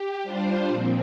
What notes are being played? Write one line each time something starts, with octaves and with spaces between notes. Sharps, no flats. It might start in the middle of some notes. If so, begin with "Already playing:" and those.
Already playing: G4
G3 D4 F4 C5
A#2 F3 C4